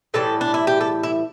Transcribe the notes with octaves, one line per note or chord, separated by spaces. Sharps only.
A2 E3 G3 A4
D4
E4
G4
A4
E4